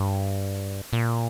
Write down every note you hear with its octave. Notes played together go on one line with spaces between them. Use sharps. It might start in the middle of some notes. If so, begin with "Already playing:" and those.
Already playing: G2
A#2